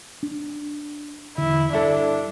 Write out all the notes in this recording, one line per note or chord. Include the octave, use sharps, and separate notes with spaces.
D4
E1 D3 E4
G2 D4 E4 A4